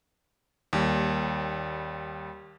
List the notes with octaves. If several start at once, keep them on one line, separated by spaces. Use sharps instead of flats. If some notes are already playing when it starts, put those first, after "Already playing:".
D#2 G3